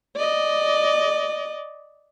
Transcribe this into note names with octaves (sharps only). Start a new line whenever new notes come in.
D5 D#5